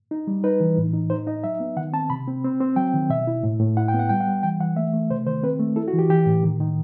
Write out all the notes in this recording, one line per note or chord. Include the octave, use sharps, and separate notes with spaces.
D#4
G3
D#4 B4
E3
A2
D#4
D#4 C5
D#4 D#5
F#3 E5
B3
D#3 F#5
C4 A5
C3 B5
C4
C4
C4
F#3 G5
D#3
B2 E5
E4
A2
A2
E4 F#5
G5
B3
F#5
G3 G5
F#5
G3
E3 G5
E3 F#5
A3 E5
A3
C3 C5
D#3 C5
C4 B4
A3
E4 A4
F#4
E3
G4
E3 G4
A2
D#3
D#3